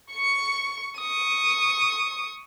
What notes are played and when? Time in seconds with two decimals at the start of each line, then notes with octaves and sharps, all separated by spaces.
0.12 C#6 C#7
0.98 C#6 D#6